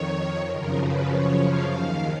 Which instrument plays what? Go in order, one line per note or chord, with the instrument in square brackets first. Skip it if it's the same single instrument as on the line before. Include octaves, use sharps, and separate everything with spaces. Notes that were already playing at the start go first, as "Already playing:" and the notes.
Already playing: [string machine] F2 D#3 C#5
F#2 C#3 F3 A#4
B4
C#5
F5
D#2 D#3 F5